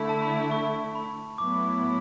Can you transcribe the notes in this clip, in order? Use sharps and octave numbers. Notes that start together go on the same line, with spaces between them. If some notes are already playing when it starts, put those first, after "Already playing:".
Already playing: D3 A3 E4
A5
B5
C#6
B5
A2 F#3 B3 E4 D6